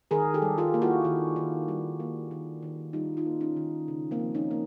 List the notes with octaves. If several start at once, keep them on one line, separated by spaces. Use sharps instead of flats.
D#3 G#4 A#4
G4 A4
G3
F4 G4
A#3
E4 F#4
D#3
D#3
G3
A#3
D#3
D#3
G3 D#4 F4
D#4 F4
A#3
C#4 D#4
D#3
C#3
A#3 C4
F3
C#4 D#4
A#3